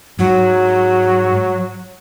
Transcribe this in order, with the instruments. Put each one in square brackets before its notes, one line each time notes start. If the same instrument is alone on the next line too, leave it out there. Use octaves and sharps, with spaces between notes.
[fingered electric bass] G#2 [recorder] F#3